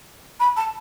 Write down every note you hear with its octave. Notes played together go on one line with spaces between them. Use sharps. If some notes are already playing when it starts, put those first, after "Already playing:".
B5
A5